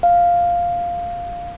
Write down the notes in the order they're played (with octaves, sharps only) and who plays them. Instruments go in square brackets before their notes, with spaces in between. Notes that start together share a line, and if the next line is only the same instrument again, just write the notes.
[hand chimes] F5